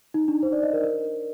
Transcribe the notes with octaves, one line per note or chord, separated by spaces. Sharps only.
D#4
D4
C5
D5
D#5
A#4
A#4